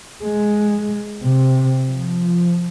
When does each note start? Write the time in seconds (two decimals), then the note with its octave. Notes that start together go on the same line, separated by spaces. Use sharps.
0.23 G#3
1.22 C3
1.87 F3